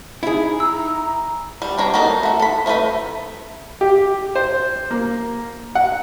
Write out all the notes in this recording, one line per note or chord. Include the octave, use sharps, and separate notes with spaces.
D#4 E4 G#4
A#5 E6
G3
G3 D4 C#5 A#5
A#3 B3 D#4 A4 A#4
A3 F#4
A4 B5
F3 A3 D#4 B4 B5
G4
C5
A#3
F#5